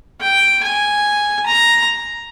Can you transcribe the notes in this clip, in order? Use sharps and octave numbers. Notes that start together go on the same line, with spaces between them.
G5
G#5
A#5